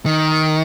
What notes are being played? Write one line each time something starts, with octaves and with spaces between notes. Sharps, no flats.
D#3